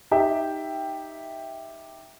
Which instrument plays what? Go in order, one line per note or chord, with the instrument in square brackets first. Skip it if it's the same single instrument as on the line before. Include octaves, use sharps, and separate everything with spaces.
[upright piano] D#4 G4 E5 G5